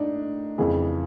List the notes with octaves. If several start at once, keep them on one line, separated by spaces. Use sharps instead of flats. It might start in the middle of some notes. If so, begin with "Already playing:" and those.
Already playing: A2 D4 D#4
F2 C#3 E3